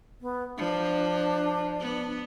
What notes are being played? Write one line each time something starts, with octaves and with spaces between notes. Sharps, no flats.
B3
F3 D4
B3